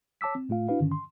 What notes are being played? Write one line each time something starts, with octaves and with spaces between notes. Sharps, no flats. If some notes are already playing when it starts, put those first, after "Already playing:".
C#5 A5 D6 E6 B6
C4
A2 A3 F4 F5
D4 E4 F#4 B4 F5
G2 D3 D#3 C#4
C6